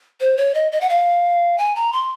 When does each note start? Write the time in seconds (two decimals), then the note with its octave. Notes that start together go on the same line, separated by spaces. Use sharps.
0.20 C5
0.37 C#5
0.54 D#5
0.72 D#5
0.81 F#5
0.89 F5
1.58 G#5
1.75 A#5
1.93 C6